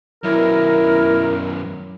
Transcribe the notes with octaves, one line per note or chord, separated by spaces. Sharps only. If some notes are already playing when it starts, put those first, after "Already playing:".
B1 F#2 E4 A#4